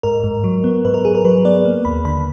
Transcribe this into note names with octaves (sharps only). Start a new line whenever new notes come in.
G#2 A#4
G#2
F#3
B3
G#2 B4
A#4
G#2 G#4
A#4
F#3 B4
B3 D5
A#3
D#2 B5
D3 B5